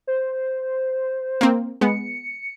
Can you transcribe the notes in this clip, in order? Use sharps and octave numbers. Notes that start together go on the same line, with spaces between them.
C5
A#3 C4
G#3 B3 C#7